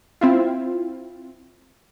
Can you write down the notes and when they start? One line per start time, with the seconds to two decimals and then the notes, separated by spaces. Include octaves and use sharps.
0.21 C4 E4 F4